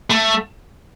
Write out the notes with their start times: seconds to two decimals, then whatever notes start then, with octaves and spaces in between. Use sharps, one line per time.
0.10 A3